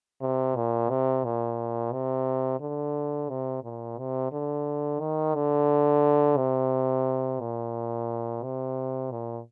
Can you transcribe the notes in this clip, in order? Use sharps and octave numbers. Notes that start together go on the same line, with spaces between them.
C3
A#2
C3
A#2
C3
D3
C3
A#2
C3
D3
D#3
D3
C3
A#2
C3
A#2